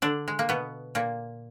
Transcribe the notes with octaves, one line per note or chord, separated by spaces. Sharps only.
D3 D4
G#3
A#3
B2 B3
A#2 A#3